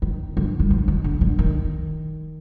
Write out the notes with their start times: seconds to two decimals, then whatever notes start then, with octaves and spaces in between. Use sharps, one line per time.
0.02 D#3
0.37 D3
0.60 G3
0.70 F3
0.88 D#3
1.04 D3
1.21 D3
1.39 D#3